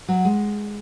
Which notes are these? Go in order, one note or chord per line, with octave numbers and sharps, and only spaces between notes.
F#3
G#3